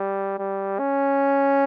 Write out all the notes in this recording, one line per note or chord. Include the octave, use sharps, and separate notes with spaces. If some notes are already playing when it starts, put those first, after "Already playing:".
Already playing: G3
G3
C#4